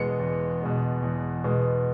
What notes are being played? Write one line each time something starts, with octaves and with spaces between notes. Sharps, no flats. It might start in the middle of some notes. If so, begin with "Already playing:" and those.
Already playing: E2 B2 G#3 B3 C#7
E2
B2 G#3 B3
E2
B2 G#3 B3